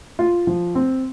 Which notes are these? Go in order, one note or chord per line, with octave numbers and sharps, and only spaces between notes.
F4
F3
C4